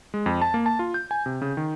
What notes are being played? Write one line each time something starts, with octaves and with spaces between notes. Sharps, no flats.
G#3
F2
A5
A#3
A5
F4
G6
G#5
C3
C#3
D#3